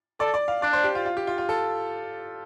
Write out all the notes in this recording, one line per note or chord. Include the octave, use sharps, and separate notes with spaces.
A4 D5
D5
F5
D4 D5
C5
G4
F4
F4
G4
F4
F4
A4